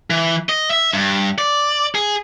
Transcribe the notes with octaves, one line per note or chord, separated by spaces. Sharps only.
E3
D#5
E5
G2
D5
G#4